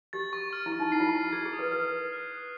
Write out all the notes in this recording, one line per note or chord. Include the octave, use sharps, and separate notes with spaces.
G4 A6
C#6
F6
E4
C#6
D#4
E4 C7
F4
E4
D#7
G#4 G#6
G#4
D#6
B4
B4 A6
C#7
F#6
D#6